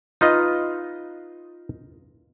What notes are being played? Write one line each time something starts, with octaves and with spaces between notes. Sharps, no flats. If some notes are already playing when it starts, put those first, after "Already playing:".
D#4 F4 B4 D#5